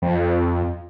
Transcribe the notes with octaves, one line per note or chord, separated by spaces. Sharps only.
F2